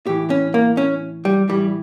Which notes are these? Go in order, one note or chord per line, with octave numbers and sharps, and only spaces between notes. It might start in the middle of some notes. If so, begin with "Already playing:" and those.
A2 E3 G4
C#4
A#3
C#4
G3
A2 E3 G3